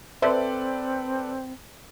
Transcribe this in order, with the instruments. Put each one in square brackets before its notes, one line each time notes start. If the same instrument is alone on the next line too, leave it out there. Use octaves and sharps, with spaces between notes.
[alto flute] C4 [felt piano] A4 B4 D5 [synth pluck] C5 E5